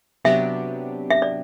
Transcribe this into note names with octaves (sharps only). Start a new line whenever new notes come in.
C3 F#3 B3 D4 G4 E5
E5
D5